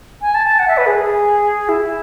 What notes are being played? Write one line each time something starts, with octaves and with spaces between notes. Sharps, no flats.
G#5
A5
A5
F#5
E5
B4
G#4
E4